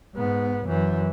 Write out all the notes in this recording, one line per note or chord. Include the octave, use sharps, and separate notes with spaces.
G#2 B3
F#2 E3